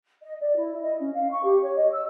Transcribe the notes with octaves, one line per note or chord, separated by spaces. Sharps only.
D#5
D5
E4
D#5
C#4
F5
C#6
G4
C#5
D#5
E6